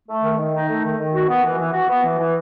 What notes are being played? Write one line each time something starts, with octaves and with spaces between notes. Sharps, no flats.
A3
D#3
D#3
D#4
A3
D#3
D#3
F#4
B3
E3
E3
F#4
B3
E3
E3